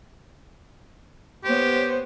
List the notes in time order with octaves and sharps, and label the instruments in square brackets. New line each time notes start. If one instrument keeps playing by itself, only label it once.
[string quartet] B3 C5 C#5 [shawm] G4